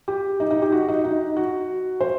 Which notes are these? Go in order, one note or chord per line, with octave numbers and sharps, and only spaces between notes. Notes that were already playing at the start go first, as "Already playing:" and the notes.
G4
D#4
D#4
G4
F#4
D#4
D#4
F#4
C5